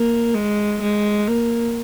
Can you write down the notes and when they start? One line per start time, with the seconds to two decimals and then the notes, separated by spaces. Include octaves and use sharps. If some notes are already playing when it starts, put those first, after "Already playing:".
Already playing: A#3
0.34 G#3
0.82 G#3
1.28 A#3